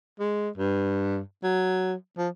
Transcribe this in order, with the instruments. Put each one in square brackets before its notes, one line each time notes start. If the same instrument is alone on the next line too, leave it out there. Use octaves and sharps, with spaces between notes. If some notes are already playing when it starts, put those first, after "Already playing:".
[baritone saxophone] G#3
G2
F#3
F3